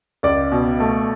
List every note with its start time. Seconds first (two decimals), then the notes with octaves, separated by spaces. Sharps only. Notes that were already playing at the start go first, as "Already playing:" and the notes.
0.23 C#2 D5
0.52 B2
0.80 A3